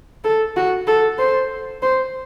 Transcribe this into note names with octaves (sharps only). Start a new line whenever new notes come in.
A4
F#4
A4
C5
C5